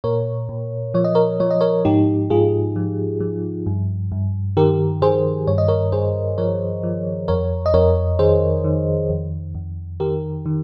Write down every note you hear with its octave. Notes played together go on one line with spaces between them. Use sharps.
A#2 A#4 C#5
A#2
F3 C#5
D#5
A#4 C#5
F3 C#5
D#5
A#4 C#5
G#2 D#4 G4
G#2 F4 G#4
F3
F3
G2
G2
D#3 G4 A#4
D#3 G#4 C5
G2 C#5
D#5
A#4 C#5
G2 G#4 C5
F3 A#4 C#5
F3
F2 A#4 C#5
D#5
F2 A#4 C#5
D#3 G#4 C5
D#3
F2
F2
D#3 G4 A#4
D#3